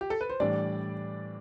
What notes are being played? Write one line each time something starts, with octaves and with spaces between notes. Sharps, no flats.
G4
A4
B4
C5
A2 E3 G3 D4 D5